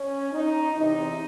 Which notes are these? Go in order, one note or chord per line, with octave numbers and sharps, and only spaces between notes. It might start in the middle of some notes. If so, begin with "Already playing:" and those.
Already playing: C#4
D#4
E2 C3 E3 D#4